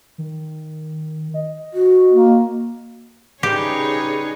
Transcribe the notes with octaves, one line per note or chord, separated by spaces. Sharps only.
D#3
D#5
F#4
A#3
C#3 G3 D#4 G4 G#4 B4 C#5